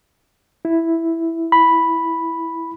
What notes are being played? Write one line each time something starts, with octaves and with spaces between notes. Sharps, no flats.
E4
B5